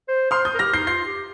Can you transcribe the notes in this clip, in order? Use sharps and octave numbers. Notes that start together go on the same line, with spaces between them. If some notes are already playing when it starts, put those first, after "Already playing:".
C5
C5 C6 F6
D#6 G6
A#4
G4 F6 A#6
D#4 G6 C7
F4 G6 C7
G4